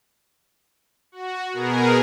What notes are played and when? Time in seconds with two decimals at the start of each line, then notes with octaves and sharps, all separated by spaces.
1.12 F#4
1.53 B2 B3 G#4 A#4